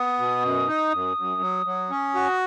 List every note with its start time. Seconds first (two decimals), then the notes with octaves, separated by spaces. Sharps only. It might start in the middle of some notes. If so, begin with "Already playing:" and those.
Already playing: B3 D#6
0.18 B2
0.43 F#2
0.68 D#4
0.92 F#2
1.17 F#2
1.41 F#3
1.66 F#3
1.90 C#4
2.15 F#4